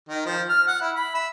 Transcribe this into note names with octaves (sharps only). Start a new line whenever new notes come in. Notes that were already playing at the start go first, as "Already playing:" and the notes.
D#3
F3
F6
F#5
E4
B5
E5